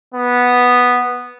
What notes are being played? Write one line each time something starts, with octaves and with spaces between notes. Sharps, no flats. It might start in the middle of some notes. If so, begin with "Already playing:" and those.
B3